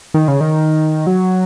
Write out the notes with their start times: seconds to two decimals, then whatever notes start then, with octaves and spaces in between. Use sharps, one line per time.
0.14 D#3
0.28 C#3
0.41 D#3
1.07 F#3